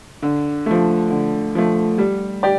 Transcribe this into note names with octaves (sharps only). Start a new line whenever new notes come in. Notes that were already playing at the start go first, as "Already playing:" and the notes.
D3
F3 A3
D3
F3 A3
G3
G4 D5